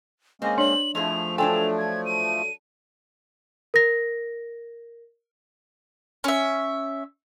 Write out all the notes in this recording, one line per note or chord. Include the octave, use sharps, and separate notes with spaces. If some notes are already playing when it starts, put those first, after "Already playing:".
G#3 A#3 C4 C#4 D#5
D4 C#5 D5 F#7
F2 F3 A3 E4 G#4 F7
F#3 D4 A4 G5 G#5 C6 F7
G#6
D#7
A#4 A#6
C#4 E5